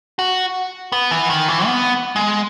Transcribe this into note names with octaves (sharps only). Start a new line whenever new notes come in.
F#4
B3
E3
D#3
E3
B3
G#3